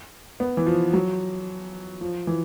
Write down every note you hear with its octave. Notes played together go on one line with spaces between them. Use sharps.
B3
E3
F3
F#3
F3
E3